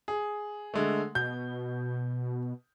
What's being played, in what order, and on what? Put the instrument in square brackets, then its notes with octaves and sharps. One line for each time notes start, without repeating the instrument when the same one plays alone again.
[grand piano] G#4
D3 G#3 A3
[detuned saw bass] B2 [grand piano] G6